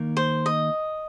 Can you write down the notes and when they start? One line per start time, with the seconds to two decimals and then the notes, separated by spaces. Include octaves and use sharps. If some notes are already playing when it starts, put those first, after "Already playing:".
Already playing: D#3 A#3 D#4 A#4
0.17 C5
0.46 D#5